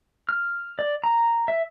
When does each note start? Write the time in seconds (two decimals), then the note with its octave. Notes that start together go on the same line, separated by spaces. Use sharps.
0.29 F6
0.79 D5
1.04 A#5
1.48 E5